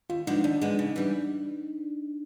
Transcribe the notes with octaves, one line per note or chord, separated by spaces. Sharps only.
D#2 F4
D3 F3 G#3 B3 D#4
D#2 D4
D3 F3 G#3 B3
C#3
E3 G3 B3